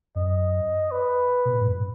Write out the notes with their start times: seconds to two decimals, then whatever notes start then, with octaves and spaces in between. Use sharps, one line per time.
0.15 F#2 D#5
0.92 B4
1.45 B2
1.53 A#2
1.60 G#2
1.67 F#2